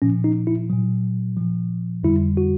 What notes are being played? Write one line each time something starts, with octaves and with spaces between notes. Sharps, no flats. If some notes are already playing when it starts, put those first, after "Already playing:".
A#2 F3 C#4
D#4
E4
A#2 F#3
A#2 F3
F2 D3 G3 E4
F#4